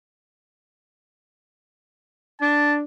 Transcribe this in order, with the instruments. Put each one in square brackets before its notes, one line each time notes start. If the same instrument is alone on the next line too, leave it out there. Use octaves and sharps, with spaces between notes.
[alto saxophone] D4 [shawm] A5